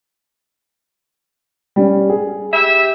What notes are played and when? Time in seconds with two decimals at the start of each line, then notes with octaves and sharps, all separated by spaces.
1.76 G3 C#4
2.09 G#4
2.52 G4 E5